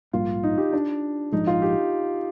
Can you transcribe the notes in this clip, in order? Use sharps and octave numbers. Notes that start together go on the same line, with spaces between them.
A#1 G#2 G3 A#3 F4
D#4
G4
D4
A#1 G#2 F3 G#3 D#4
F4
G4